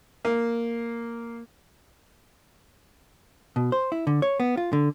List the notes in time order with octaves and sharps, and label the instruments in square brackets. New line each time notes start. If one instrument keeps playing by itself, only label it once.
[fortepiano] A#3
[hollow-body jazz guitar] B2
C5
E4
D3
C#5
B3
F4
D3